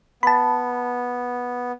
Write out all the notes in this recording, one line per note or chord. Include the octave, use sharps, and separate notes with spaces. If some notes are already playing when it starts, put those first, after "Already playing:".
B3 A5 B5